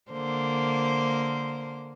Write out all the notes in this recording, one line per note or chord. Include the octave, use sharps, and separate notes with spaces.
D3 A#3 C5